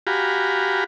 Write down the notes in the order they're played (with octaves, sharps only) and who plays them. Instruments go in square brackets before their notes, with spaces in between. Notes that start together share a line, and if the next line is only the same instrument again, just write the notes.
[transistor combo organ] F#4 G4 F5 G#5 A#5 B5